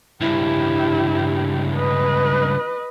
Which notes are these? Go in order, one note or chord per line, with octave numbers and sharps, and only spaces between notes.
C#2 G2 E4 G4
B4 D#5